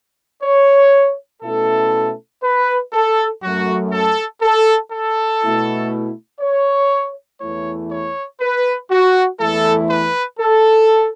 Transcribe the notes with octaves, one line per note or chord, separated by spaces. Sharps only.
C#5
B2 A3 C#4 E4 A4
B4
A4
F#2 F#3 A3 F#4
A4
A4
A4
B2 A3 E4
C#5
E2 E3 A3 E4 C#5
C#5
B4
F#4
E2 E3 A3 E4 A4
B4
A4